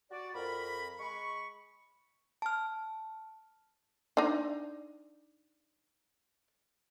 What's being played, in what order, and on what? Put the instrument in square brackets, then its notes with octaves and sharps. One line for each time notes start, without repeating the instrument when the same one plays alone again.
[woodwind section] F#4 D5
F2 A#4 B5
G#3 B5 C#6
[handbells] A5 F6
[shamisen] D4 D#4